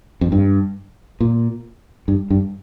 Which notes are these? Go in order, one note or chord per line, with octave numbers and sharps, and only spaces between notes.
F2
G2
A#2
G2
G2